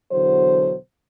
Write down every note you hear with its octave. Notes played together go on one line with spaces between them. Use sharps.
E2 B2 D3 F#3 C5